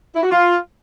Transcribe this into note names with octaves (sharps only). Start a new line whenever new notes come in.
E4
F#4
F4